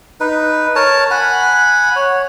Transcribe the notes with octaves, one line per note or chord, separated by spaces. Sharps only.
D#4 B4
A#4 C#5 A5
F#5 G#5 B5
C#5